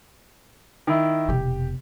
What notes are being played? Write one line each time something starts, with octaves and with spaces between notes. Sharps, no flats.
D#3 E4
F1 B2 G4